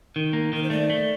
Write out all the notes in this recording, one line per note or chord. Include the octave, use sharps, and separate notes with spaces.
D#3
A#3
D#3 A#4
C5
A3 D5
A3